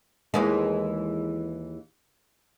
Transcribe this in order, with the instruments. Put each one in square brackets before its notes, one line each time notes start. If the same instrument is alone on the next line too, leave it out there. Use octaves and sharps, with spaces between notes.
[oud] D#2 E3 G#3